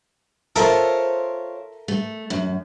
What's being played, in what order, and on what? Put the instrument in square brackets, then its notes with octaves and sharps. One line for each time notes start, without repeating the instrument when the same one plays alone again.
[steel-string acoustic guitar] F4 C5 C#5 [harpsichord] A4 A#4 E5
[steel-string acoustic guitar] A3
F#2